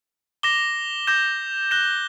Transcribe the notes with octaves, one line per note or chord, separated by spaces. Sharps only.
D6 A#6 E7 G7
D6 G6 A#6 E7
F#6 A#6 E7 G7